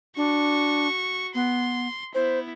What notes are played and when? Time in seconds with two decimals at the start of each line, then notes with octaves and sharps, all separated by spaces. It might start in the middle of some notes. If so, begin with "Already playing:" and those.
0.17 D4 F#4 C#6
1.35 B3 C6
2.15 B3 E4 C5